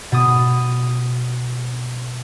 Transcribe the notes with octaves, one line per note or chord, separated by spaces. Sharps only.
B2 D#6